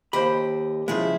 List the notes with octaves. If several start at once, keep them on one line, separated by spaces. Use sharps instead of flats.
D#2 G4 C5 D#5 B5
C#3 F3 G#3 E4 G#4